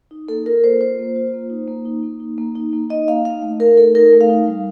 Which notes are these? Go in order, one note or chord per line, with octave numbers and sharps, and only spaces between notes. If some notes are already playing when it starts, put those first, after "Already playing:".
D#4
A#3 A4
F4 A#4
A#3 C5
F4 C5
A#3
F4
A#3
D#4
A#3
D#4
A#3
D#4
A#3
D#4
A#3
D#4 D#5
A#3 F5
D#4 F5
A3
D#4 A#4
A3 A4
D#4 A#4
A3
F5
D#4
G3